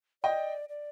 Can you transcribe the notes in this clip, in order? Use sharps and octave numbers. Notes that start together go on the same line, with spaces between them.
D5 D#5 G5
D5